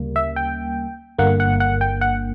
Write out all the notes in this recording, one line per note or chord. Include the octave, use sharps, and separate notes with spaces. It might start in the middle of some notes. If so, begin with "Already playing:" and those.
Already playing: D2 C#3 G3 A#3
E5
G5
G1 G2 D3 A#3 F#5
F#5
F#5
G5
F#5